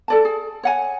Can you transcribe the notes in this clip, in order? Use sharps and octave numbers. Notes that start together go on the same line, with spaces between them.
A4 D5 A5
G#4
C#5 F#5 G#5